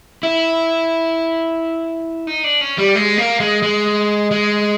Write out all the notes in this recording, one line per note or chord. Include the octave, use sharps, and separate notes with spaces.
E4
D#4
D4
C#4
G3
G#3
A#3
G#3
G#3
G#3